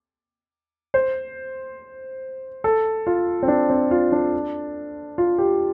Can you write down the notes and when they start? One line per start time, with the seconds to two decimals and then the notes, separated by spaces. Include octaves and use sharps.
0.94 C5
2.64 A4
3.07 F4
3.43 C4
3.48 D4
3.70 C4
3.91 F4
4.12 D4
5.18 F4
5.38 G4